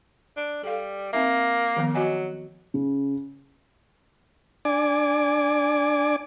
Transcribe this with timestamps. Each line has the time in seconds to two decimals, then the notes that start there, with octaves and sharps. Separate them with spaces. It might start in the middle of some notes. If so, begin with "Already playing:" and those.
0.37 D4
0.63 G3 A4 F5
1.13 A#3 C4 D#4 E5
1.77 D#3 F3 B3
1.94 F#3 F#4 D#5 G#5
2.74 C#3
4.65 D4 D5 G#5 D6